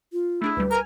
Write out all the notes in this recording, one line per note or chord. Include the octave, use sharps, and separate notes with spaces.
F4
A3 D4 E4 G#4
D2 G3 B4
A#4 G#5 F6